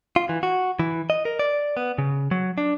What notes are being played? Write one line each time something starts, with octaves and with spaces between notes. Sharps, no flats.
F4
E3
F#4
E3
D#5
A#4
D5
B3
C#3
F#3
D4